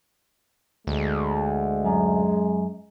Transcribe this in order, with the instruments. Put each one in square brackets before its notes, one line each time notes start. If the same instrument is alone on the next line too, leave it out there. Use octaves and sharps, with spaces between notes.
[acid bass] D2 [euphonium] G#3
[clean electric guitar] F#2